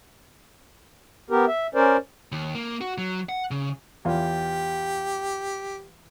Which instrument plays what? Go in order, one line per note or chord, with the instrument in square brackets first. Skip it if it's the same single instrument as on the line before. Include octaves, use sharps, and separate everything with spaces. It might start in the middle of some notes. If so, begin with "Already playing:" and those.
[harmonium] B3 G4 A#4
E5
C#4 A#4 C5 D5
[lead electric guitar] D#2
A#3
F#4
F#3
F#5
C#3
[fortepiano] E2 F4 [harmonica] G4